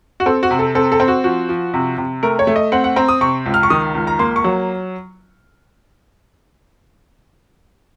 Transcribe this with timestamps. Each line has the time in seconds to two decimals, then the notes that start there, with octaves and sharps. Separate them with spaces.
0.20 F#4
0.26 C4 A4
0.43 F#4
0.51 C3
0.59 A4
0.75 C4 A4
0.92 A4
1.00 C4
1.08 F#4
1.24 F3 F#4
1.49 F3
1.74 C3
1.98 C3
2.23 A3 A#4
2.39 C#5
2.47 A3
2.56 D#5
2.72 C4 F#5
2.84 F#5
2.96 C4 A#5
3.09 D#6
3.21 C3 C#6
3.46 C#2
3.54 F6
3.63 C#6
3.70 D#3 D#6
3.95 C#2
4.07 A#5
4.19 A#3 C6
4.36 C#6
4.44 F#3